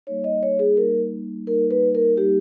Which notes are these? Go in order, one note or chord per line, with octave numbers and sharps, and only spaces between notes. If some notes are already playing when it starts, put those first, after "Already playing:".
G3 A#3 D#4 C#5
D#5
C#5
G#4
G3 A#3 D#4 A#4
G3 A#3 D#4 A#4
B4
A#4
G3 A#3 D#4 G4